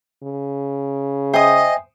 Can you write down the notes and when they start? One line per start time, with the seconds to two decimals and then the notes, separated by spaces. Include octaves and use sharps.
0.23 C#3
1.34 C5 D#5 E5 G5 G#5 D#6